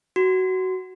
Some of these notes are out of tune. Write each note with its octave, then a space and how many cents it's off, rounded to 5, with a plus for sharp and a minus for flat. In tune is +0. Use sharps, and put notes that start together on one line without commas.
F#4 +15